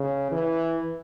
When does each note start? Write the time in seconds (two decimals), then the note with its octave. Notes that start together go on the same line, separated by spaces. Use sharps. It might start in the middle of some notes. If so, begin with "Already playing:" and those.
Already playing: C#3
0.31 E3